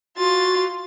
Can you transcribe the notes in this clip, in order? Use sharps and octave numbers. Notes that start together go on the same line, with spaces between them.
F4 F#4 A6